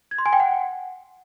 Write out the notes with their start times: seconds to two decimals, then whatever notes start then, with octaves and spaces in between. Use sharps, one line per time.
0.11 G#6
0.18 C6
0.26 G#5
0.33 G5
0.40 F#5